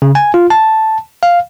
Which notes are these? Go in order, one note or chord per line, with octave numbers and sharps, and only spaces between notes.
C#3
G#5
F4
A5
F5